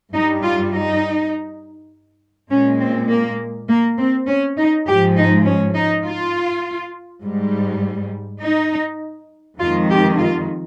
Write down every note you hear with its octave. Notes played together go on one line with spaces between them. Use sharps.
G2 G3 D#4
F4
D#4
A#2 G#3 C#4
C4
A#3
A#3
C4
C#4
D#4
G#2 F3 G#3 G4
D#4
C#4
D#4
F4
G#2 G3
D#4
F2 D#3 G#3 F4
G4
F4